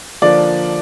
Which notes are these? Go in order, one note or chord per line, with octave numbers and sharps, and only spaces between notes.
D3 F3 A#3 D4 D5